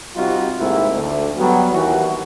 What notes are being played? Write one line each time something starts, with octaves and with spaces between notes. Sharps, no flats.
C3 G3 C4 D#4 F4 F#4
D#2 G#2 C3 A3 A#3 E4
D2
F#3 G3 B3
D#2 E3 F#4